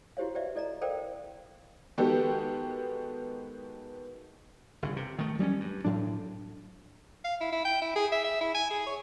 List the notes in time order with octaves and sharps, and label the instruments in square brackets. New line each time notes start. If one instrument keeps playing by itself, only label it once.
[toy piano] E4 F#4 G4 C5 C#5 F5
G4 B4 C5 D5 E5 F5
E4 A4 D5 D#5 A#5
A4 A#4 C5 D5 F5 G5
[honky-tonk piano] D#3 G#3 B3 F#4 G4 A4
[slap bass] G1 C#3
C3
D#3 A3
F#3 G3 C4 C#4
G2
A2 F#3 D4
[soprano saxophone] F5
E4
E4
G5
E4
G#4
E5
E5
E4
G#5
G#4
C#5